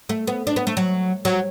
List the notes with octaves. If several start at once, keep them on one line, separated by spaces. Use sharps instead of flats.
A3
B3
D4
B3
A3
F#3
F#3